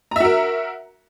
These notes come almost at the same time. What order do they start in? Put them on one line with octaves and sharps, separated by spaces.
A#5 E5 F#4 A#4